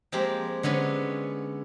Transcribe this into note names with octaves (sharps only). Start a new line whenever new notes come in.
F3 G#3 A#3 C4 G4
D3 G#3 B3 C#4 C#5